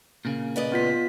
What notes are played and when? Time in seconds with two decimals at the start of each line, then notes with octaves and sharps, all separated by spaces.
0.25 A#2 C#3 A#3
0.56 B4 D5 D#5
0.72 B3 F4 B6